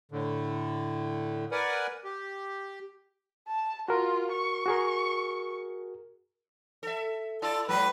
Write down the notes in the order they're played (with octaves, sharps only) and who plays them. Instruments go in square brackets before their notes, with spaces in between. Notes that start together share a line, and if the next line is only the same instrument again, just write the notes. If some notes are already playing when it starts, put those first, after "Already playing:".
[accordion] A2 D3
A#4 B4 D5 F#5 G#5
G4
[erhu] A5
[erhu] F4 [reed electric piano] F#4 A#4
[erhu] C#6
[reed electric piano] F#4 G#4 A#4
[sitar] A4 E5
[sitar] E4 D5 [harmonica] A4
[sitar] G#2 F#3 [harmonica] B4